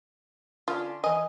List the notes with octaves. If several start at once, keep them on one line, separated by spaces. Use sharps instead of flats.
D3 C#4 D4 F4
E3 D#5 G#5